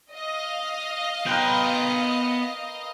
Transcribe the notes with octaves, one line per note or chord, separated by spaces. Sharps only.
D#5 F5
B3 A#4 B4 G5 C6